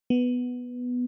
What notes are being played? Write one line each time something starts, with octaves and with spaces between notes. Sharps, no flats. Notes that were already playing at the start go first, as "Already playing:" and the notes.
B3